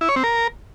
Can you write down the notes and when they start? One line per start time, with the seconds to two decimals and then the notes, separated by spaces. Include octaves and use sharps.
0.01 E4
0.09 C#5
0.16 C4
0.24 A#4